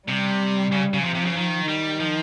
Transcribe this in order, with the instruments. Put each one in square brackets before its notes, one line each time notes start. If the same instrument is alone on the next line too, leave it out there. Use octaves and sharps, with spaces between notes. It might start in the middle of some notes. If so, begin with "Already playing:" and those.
[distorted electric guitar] C3 [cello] G3
[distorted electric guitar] C#3
C#3
[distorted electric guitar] C3 [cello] F3
[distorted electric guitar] C3
C#3
D#3
[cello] D#3 [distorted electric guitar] G3
[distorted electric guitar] F3